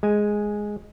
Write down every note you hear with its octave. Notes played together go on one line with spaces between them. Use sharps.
G#3 G#5